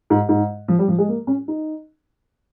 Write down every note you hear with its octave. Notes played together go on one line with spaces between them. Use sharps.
G#2
G#2
F3
G3
F3
G#3
A#3
C#4
D#4